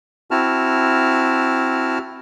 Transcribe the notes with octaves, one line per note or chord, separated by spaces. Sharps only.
C4 E4 F#4 A5 F6